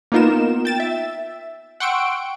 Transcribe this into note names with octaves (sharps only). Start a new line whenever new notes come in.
A#3 B3 D#4 F4 A#4 E7
G5 A6 E7
E5
F#5 G5 C6 C#6 E6 D7